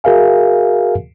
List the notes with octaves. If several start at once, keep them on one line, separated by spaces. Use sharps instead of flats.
F#4 G#4 A#4 E5 F5 G#5